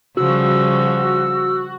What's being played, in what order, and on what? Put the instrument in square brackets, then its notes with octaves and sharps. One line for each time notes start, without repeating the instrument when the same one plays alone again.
[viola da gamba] C#3 F3 G3 [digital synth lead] F#4 [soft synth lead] E6